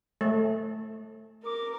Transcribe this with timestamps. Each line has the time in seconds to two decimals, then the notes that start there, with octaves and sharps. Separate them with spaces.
0.21 A3
1.44 A#4 D6